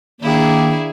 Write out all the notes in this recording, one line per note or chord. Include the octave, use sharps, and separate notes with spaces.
D#3 A#3 D4 E4 G#4